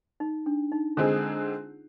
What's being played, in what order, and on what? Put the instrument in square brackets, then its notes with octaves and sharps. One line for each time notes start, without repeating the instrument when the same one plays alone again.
[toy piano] D#4
D4
D#4
[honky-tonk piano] D3 G#3 C4 D#4 G#4 [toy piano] F4